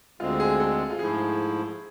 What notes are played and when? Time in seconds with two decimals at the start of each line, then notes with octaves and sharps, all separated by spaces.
0.20 D2 D3 G#3 C4 F4
0.40 G#4
0.60 A4
0.90 F4
0.99 G#2 F3 A3 E4 G#4